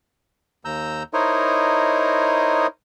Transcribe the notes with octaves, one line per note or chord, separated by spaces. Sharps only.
D#2 A#5 E6 G6
D#4 E4 A#4 C5 C#5 D#5